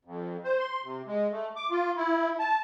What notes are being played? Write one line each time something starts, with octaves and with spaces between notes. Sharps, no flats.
F2
C5
C6
C3
G#3
A3
D6
F4
E4
A5